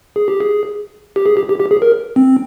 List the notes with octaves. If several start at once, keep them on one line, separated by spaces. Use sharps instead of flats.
G#4
G4
G#4
G4
G#4
G4
G4
G4
G#4
A#4
C4